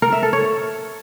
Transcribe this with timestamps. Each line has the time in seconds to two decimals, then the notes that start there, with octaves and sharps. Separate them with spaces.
0.02 A#4
0.12 E5
0.23 A4
0.33 C#5